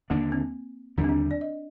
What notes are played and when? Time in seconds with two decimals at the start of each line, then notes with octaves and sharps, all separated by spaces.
0.10 D#2 D3 G#3 A#3 D4
0.32 C4
0.97 D#2 D3 G3 D4
1.04 C4
1.09 D4
1.31 D5
1.41 D#5